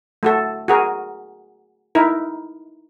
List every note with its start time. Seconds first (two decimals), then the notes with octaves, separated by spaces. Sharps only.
0.23 A3 F#4 A4
0.68 F#4 G#4 A#4
1.95 D#4 E4 A#4